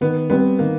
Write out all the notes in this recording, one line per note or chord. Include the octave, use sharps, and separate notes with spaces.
D#3 B3
G3 B3 C4
D#3 A#3